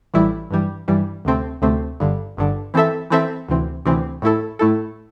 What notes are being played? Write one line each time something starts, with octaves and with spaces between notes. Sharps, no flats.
A1 A2 E3 G3 E4
G2 E3 G3
G2 E3 G3
D2 C3 A3 C4
D2 C3 A3 C4
G1 G2 D3
G1 G2 D3
E3 C4 A4 E5
E3 C4 A4 E5
D2 C3 E3 C4
D2 C3 E3 C4
A2 A3 E4 A4
A2 A3 E4 A4